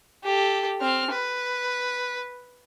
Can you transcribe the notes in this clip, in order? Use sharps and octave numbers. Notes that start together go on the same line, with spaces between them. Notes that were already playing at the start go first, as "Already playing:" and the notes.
G4 A4
C4 F6
B4